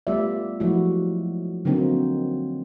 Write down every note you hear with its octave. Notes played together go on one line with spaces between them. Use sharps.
G3 A3 B3 F4 D5 E5
F3 F#3 G#3 A3 E4 F#4
D3 F#3 A#3 C4 D#4